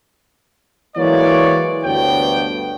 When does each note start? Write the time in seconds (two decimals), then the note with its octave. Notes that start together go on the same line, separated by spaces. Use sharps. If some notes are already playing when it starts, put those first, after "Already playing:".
0.97 E3 F#3 G#3 A#3 C#5 D5
1.84 D2 G2 B3 D4 C#5 G5